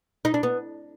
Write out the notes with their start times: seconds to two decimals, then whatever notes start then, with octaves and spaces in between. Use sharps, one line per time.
0.25 D#4
0.34 D4
0.43 B3